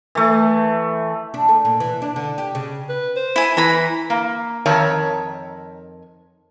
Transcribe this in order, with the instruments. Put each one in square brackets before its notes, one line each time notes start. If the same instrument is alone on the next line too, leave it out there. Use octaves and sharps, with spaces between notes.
[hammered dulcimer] E3 A3
[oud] D4
A3
A#2
E3
D4
D3
G4
C#3
[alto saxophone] B4
C5
[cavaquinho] E4 G#5
[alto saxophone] E3 [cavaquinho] A#5 B5
[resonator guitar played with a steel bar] A#3
F2 D#3 A#4 C#5 E5 A5